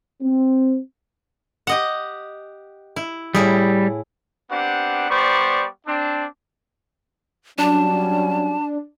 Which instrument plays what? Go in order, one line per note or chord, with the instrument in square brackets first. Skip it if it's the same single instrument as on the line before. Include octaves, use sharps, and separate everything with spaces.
[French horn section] C4
[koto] G4 D#5 F#5
E4
[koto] A2 E4 G#4 [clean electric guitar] G3
[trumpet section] B3 C4 D4 G4 F#5
G3 B3 C5 D5 C#6
C4 D4
[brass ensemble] F#3 G3 C#4 [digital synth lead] D4 [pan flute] A5